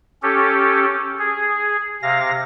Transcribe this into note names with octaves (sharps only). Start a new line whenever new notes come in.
C#4 G4 A4
G#4
C3 F5 A#6